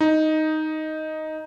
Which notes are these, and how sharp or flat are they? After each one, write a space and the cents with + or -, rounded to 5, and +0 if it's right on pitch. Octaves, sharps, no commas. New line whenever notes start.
D#4 +5